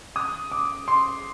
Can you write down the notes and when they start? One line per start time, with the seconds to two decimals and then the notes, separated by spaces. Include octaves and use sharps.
0.16 D#6
0.52 D6
0.88 C6